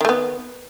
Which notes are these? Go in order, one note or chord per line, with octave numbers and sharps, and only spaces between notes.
D#3 A3 B3